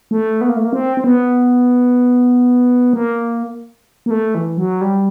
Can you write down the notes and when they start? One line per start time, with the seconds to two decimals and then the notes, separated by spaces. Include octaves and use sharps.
0.11 A3
0.41 B3
0.49 A#3
0.56 A3
0.65 A#3
0.73 C4
0.97 C4
1.04 B3
2.93 A#3
4.06 A#3
4.11 A3
4.35 E3
4.57 F#3
4.81 G3